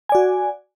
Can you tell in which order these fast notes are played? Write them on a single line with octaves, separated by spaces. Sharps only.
G#5 D5 F#4